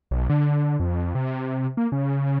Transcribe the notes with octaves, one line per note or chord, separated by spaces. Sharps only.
B1
D3
F2
C3
A#3
C#3